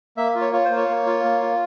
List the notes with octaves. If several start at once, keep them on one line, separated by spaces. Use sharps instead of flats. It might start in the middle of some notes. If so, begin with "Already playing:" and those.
A#3 E5
F4
C#5
F4 C#5
C5
A#3
C#5
A#3
F4
A#3
F4